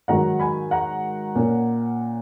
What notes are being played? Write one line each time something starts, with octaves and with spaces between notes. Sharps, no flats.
G#2 D#3 F#3 F#5 A#5
G#5 B5
F#5 A#5
A#2 A#3 C#4